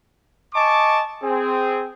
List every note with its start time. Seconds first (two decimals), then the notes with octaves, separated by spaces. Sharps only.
0.54 D#5 G#5 A5 C#6 D6
1.22 C4 G#4